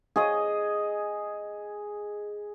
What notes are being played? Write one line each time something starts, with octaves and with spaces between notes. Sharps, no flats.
G#4 D#5